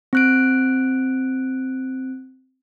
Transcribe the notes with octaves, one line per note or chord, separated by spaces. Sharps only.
C4 F#6 D7